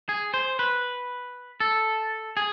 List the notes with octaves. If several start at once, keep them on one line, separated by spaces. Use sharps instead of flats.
G#4
C5
B4
A4
G#4